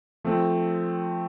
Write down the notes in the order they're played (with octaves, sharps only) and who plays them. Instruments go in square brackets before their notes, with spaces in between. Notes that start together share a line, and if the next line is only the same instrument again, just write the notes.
[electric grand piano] F3 A3 C4